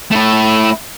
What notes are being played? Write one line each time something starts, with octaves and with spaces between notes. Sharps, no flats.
A3 E4